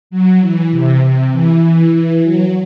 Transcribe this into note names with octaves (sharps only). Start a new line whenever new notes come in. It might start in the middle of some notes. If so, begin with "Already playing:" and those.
F#3
E3
C3
C3
E3
E3
E3
F#3